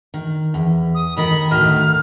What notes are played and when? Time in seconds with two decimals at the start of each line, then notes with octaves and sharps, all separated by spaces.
0.14 D#3
0.54 E2
0.94 D#6
1.17 D#2 D#3 A#4 B5
1.51 D2 A2 D#3 F6